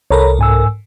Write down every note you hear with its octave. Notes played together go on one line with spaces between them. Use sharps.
C2 A4 A#4 C#5 A#5 B5
G#2 G#5 E6